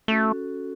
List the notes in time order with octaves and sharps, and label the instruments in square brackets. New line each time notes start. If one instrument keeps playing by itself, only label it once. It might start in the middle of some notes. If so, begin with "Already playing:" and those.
[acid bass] A3 [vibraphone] C#4 F#4 A4